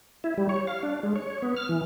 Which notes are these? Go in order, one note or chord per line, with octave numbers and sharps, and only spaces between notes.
E4
G3
C#5
F5
D4
G#3
C#5
B3
F6
E3